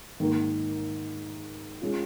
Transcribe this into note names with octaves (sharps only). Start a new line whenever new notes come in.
G#2 D#3 A#3
G#3 C#4 F4